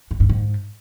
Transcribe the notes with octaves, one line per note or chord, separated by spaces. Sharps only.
G#2
G2
G#2